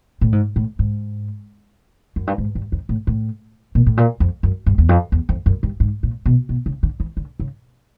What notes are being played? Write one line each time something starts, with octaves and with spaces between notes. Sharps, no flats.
A2
G#2
A2
G#2
F#2
G2
G#2
G2
F2
A2
A2
A#2
A2
A#2
F2
F#2
G2
E2
F2
E2
F2
F#2
G2
G#2
A#2
B2
B2
C#3
D3
E3
D3
C#3